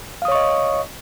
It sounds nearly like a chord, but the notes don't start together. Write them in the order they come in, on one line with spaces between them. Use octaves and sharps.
F5 D#6 C#5 C#6 D#5